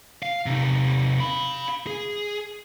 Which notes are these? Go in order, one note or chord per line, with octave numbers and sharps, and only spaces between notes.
F5
C3 D#4
F5 B5
G#4